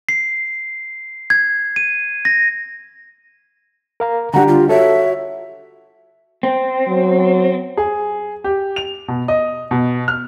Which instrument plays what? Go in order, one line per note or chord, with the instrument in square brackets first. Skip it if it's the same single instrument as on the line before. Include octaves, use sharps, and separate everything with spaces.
[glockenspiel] C7
G#6
D#7
A#6
[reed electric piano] A#4 F5 A#5
[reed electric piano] D3 G3 D4 [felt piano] G4 A#5 [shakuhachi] F#5
[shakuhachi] F4
[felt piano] F#4 C#5 [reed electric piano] A4 [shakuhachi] E5
[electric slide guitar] C4
[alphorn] F#3
[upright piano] G#4
G4
F7
B2
D#5
B2
F6